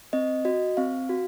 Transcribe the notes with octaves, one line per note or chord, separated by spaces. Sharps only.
C4 D#5
F#4 D#5
C4 F5
F#4